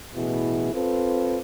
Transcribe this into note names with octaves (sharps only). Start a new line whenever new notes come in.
A1 B2 E4 G#4
C4 F4 A4 B4